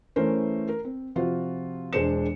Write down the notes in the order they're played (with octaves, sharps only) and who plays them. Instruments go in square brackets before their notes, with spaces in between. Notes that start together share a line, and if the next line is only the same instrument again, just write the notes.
[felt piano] E3 A3 C#4 A#4 C5
A#4
C4
C3 F3 F4 F#4 C5
E1 G#3 D4 C5 C#7 E7